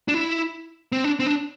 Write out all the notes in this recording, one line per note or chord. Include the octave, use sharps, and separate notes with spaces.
D4
E4
C4
D4
C4
D4